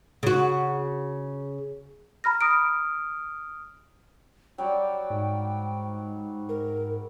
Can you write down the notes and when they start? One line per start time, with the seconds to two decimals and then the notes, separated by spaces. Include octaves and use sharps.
0.23 C#3 F#4
2.24 A#5 B5 F6 A#6
2.41 D#6 F6 D7
4.58 F#3 G3 D5 G5
5.10 G#2
6.49 A#4